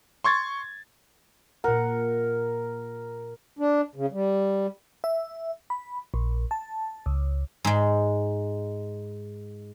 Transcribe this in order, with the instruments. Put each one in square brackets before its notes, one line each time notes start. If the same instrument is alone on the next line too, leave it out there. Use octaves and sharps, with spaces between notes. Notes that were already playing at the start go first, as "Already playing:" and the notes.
[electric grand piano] C6 C#6 G#6 A6
[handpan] A#2 F#5 [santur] A#4
[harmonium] D4
C#3
G3
[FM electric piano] E5
B5
A#1
A5
C#2
[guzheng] G#2 G#3